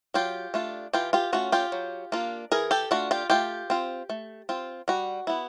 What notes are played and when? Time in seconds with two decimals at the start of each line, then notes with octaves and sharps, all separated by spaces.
0.14 F#3 F4 G4
0.54 A3 D4 F4
0.93 E3 F4 G4
1.13 F4 G4
1.33 A3 C#4 F4 F#4
1.52 F4 G4
1.72 F#3
2.12 A#3 D4 F4
2.52 E3 G#4 A#4
2.71 G4 A4
2.91 A3 D4 F4 F#4
3.11 F4 G4
3.30 A3 F4 G4
3.70 C4 F4
4.09 A3
4.49 C4 F4
4.88 G3 F#4
5.27 B3 E4